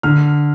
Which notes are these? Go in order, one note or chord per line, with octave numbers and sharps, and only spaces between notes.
D3 F6